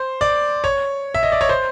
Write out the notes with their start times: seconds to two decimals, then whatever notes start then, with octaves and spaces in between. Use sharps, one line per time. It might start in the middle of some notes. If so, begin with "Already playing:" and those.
Already playing: C5
0.21 D5
0.64 C#5
1.14 E5
1.23 D#5
1.32 D5
1.41 C#5
1.49 C5